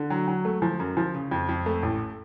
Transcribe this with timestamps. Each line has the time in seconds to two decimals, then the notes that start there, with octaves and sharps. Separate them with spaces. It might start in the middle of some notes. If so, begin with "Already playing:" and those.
Already playing: D3
0.10 F#3
0.28 F#3
0.45 A3
0.62 F3
0.80 F#2
0.97 F3
1.15 C#3
1.31 F2
1.49 F2
1.66 A3
1.83 A1